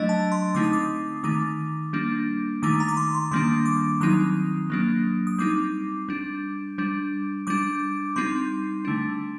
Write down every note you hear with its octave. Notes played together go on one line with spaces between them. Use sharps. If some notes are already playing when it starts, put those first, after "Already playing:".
Already playing: F#3 A3 D4 D#5
A5
C6
D3 A3 C4 D#4 D6
D#6
D6
D#3 A3 D#4 D6
G3 A#3 D4
D#3 A3 D#4 D6
A#5
D6
C6
C6
D#3 G3 A#3 D4 C6
D6
D#3 F#3 C4 D#4 D#6
F#3 A#3 D4
D#6
G3 C4 D#4 D6
G3 D4
G3 D4
G3 D4 D6
G3 C4 D#4 C6
D3 A3 D4